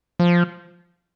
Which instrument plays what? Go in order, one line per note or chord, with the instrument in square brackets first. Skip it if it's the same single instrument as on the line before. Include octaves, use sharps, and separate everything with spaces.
[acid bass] F3